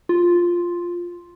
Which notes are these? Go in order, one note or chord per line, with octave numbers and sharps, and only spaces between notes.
F4